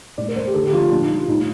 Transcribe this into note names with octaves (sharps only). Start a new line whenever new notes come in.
A2 D5
A#4
A3 C5
G4
D3 A4
G4
F3 A3 F4
A#2 D4
D#4
G3
F4
A2 D#4